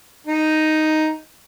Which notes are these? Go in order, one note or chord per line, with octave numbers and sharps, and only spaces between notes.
D#4